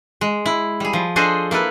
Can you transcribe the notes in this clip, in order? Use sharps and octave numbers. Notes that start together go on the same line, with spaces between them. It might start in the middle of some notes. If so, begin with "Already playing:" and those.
G#3
E4
G3 G#4
F3
D4 G#4 A4 C5 D#5
A#3 E4 A4 B4